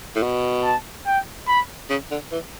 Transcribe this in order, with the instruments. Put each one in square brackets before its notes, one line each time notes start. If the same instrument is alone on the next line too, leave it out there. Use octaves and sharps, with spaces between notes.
[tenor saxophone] A2
B2
[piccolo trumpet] A5
G5
B5
[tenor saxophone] C#3
D3
E3